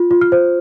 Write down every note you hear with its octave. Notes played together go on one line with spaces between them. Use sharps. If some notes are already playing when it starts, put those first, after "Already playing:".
Already playing: F4
F4
F6
C5